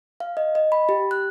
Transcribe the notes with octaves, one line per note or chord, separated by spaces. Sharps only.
F5
D#5
D#5
B5
G4
F#6